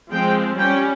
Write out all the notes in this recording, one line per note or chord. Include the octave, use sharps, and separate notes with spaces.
F3 G#3 C4 G5
G3 C#4 G5